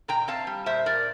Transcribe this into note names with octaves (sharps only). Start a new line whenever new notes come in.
A#2 G5 A#5
C4 F5 A5
G3
A#2 C5 E5
A#2 A#4 D5